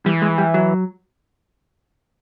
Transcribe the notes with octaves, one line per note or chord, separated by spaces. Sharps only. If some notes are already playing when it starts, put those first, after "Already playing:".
E3 G3
G#3
G3
F#3